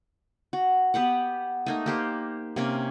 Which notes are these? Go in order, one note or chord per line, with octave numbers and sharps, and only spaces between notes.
F#4
B3 G4 B4 F#5
A3 A#3 D#4
A#3 G4 C5
C3 A#3 C#4